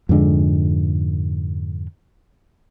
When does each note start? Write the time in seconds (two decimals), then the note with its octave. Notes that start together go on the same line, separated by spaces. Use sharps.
0.09 F2 G#2 D3 G#3